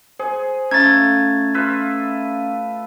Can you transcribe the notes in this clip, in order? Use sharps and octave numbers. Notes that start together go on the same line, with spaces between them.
G#4 C5
A3 C#4 F4 A#5 C#6 G#6 A6
F4 B4 E5